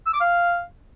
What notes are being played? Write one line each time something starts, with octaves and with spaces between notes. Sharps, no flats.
E6
D6
F5